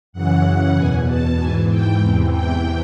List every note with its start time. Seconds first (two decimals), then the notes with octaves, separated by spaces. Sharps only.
0.12 F#2 C#3 E3 F#5
0.75 E2 B2 G#5
1.06 A5
1.37 G#2 E3 G#5
1.68 G5
1.99 E2 C3 E3
2.31 G5